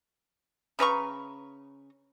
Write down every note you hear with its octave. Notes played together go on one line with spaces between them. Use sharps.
C#3 B4 A#5 C#6